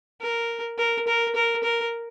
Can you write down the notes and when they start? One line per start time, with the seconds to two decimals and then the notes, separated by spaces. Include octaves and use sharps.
0.21 A#4
0.78 A#4
1.07 A#4
1.35 A#4
1.63 A#4